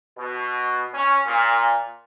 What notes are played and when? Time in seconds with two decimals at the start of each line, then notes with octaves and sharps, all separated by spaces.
0.17 B2
0.94 C#4
1.26 A#2